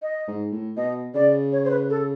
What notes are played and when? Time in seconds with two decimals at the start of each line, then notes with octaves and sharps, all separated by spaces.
0.02 D#5
0.27 G#2
0.52 A2
0.77 B2 D#5
1.15 C#3 D5
1.52 C#5
1.64 C5
1.71 B4
1.90 A4